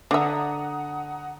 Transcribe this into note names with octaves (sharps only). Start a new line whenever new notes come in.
D3 D4 E5 F#5 A#5 D#6